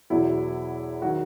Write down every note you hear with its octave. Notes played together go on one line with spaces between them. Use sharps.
E2 B2 F#3 E4
D#3 F#3 F#4